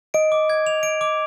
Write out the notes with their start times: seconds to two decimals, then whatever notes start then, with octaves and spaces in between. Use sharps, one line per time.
0.14 D#5 D7
0.32 D6
0.50 G#6
0.67 F7
0.83 D7
1.01 D6